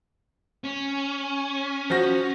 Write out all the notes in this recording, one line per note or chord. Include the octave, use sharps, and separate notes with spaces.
C#4
F3 F#4 A#6